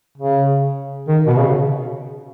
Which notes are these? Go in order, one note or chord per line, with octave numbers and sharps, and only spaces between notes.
C#3
D#3
B2
C#3